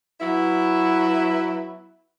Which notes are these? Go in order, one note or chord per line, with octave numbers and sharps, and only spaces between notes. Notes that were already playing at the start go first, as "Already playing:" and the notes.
F#3 B3 E4